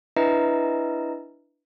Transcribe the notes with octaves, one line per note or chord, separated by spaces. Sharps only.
D4 E4 B4 D#5 E5 A#5